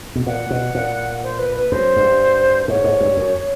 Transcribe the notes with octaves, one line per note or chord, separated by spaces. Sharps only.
B2
A#2 F#5
B2
A#2
C5
B4
B4
F#2 C5
G2
G#2 C#5
G#2
G2
F#2